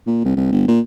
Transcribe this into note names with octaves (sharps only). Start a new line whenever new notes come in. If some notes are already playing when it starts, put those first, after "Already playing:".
A#2
C2
C2
G1
A#2